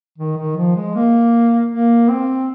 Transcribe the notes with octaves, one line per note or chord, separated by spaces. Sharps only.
D#3
D#3
F3
G#3
A#3
A#3
C4